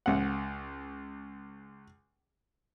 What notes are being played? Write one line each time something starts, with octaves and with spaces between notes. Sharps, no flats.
C#2 F#5